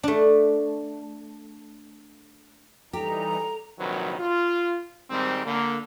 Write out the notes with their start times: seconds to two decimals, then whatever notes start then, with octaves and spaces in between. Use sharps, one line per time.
0.03 A3 D4
2.93 E3 G3 D#4 G4 A4 A#5
3.79 A#1 C3 D#3 F#3 B4
4.19 F4
5.10 G#2 D#3 G3 C4
5.45 D3 A#3